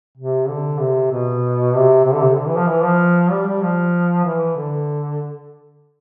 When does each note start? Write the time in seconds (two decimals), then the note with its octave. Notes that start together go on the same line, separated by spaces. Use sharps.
0.18 C3
0.48 D3
0.80 C3
1.11 B2
1.74 C3
2.05 C3
2.13 D3
2.22 C3
2.37 D3
2.47 E3
2.57 F3
2.68 E3
2.84 F3
3.31 G3
3.46 G3
3.62 F3
4.25 E3
4.57 D3